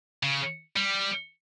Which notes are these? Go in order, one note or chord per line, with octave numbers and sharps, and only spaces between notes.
C#3
G3